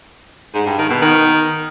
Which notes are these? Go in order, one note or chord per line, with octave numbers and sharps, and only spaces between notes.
G#2
G2
D#3
B2
D#3